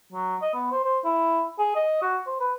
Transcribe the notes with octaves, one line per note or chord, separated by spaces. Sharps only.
F#3
D#5
B3
C5
C5
E4
G#4
D#5
F#4
C5
B4